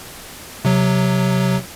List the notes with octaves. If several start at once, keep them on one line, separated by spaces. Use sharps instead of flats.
C3 F#3